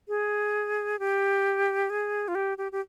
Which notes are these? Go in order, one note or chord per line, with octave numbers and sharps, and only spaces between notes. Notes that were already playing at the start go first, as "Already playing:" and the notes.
G#4
G4
G#4
F4
G4
G4
G4